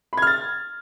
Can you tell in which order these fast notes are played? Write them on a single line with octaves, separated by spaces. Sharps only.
B5 G#6 F6 A6